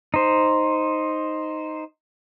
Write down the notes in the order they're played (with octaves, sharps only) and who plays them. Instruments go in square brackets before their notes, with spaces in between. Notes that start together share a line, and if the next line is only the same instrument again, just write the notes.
[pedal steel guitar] D#4 C5